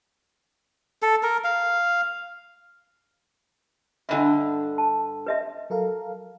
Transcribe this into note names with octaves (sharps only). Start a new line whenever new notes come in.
A4
A#4
F5
G2 D3 D4 D#5 E5
A5
B4 D#5 E5
F#3 A4 A#4 F5